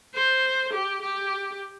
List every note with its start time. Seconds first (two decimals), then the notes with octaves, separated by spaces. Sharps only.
0.14 C5
0.73 G4
1.02 G4